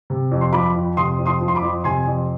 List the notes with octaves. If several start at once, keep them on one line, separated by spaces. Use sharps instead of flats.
C3
F2
C6
F3 B5 D6
F2
C3 C6 D#6
F2
C6 D#6
F3
C6
B5 D6
F2
C3 G#5 C6
F2